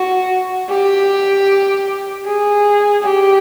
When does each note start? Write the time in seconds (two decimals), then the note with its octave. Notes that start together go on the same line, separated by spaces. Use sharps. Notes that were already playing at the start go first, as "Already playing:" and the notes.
Already playing: F#4
0.70 G4
2.26 G#4
3.03 G4